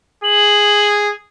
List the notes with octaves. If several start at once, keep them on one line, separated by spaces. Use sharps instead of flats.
G#4 F#7